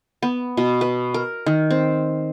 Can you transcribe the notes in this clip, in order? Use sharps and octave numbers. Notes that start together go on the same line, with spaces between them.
B3
B2
B4
A#4
D#3
C4